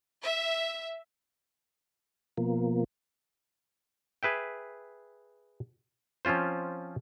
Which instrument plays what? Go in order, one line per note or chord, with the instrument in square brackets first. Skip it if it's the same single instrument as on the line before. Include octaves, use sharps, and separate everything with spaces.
[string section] E5
[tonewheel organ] B2 F3 A#3
[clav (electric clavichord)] G#4 B4 E5 G5
F3 C4 C#4 F4 C5